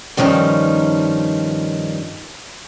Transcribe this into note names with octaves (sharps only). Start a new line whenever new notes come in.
G2 D#3 F3 C#4 D#4